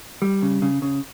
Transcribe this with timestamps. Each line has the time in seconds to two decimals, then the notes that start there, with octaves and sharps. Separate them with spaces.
0.22 G3
0.42 C#3
0.62 C#3
0.82 C#3